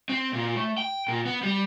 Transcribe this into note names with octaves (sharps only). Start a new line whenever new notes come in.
C4
A#2
A3
G5
A#2
B3
G3